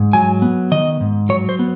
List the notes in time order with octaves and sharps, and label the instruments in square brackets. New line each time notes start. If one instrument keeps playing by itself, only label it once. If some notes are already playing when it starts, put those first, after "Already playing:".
Already playing: [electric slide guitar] G#2
F#3 G#5
B3
D#3 D#5
G#2
F#3 C#5
C5
B3